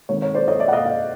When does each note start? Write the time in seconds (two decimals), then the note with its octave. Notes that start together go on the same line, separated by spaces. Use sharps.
0.09 D#3 G#3 C4 C#5
0.22 C#5
0.35 C5 D5
0.48 C#5 D#5
0.60 D5 E5
0.68 F#5
0.73 D#5 F5
0.85 D#5 F5